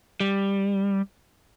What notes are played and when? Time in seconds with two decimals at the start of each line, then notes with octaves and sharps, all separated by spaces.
0.20 G3